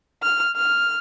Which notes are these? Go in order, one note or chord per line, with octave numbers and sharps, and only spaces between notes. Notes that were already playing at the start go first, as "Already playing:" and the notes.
F6
F6